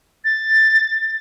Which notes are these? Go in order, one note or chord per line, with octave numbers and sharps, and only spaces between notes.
A6